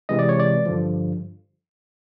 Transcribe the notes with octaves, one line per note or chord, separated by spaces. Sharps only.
C3 E3 G#3 D#5
D5
C#5
D5
G2 D3 F3